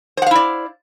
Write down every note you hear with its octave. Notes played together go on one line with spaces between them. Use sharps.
E4 C5 D5 F5 F#5